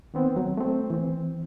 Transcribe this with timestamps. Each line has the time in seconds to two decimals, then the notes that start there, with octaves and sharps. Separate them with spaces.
0.14 D#3 B3 C4
0.36 F#3
0.57 A3 C4
0.90 E3 C4